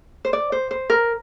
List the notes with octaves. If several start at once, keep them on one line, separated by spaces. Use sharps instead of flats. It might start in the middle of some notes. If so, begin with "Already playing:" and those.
C5
D5
C5
C5
A#4